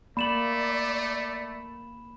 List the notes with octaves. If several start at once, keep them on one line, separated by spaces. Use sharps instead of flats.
A3 A#3 D5 B5 E7 F#7